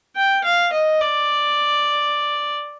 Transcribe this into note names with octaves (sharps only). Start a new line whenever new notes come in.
G5
F5
D#5
D5